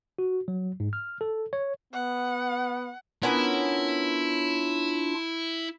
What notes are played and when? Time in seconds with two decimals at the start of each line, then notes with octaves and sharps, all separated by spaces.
0.19 F#4
0.48 F#3
0.80 G#2
0.93 F6
1.21 A4
1.53 C#5
1.93 B3 F#5
3.23 B3 C#4 D4 E4 F4 A#4